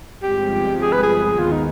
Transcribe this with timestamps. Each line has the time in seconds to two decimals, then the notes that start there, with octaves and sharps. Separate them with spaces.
0.23 G1 G2 F3 G#3 C4 G4
0.81 G#4
0.93 B4
1.03 G#4
1.39 D#2 D#3 G#3 B3 F4
1.51 D#4